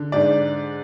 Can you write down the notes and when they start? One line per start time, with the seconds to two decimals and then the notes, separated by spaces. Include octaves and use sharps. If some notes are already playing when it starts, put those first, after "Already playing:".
Already playing: D3
0.12 G#2 D5